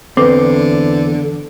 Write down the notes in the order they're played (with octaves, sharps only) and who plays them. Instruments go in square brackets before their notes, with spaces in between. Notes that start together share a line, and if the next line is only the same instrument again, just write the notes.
[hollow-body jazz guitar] E2 C4 [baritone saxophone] D3 [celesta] B4 D6